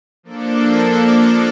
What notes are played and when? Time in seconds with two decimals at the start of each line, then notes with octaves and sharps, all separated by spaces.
0.23 F3 A#3 D4 A4